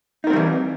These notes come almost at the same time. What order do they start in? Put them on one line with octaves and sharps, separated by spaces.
D#4 A#4 C4 G3 E3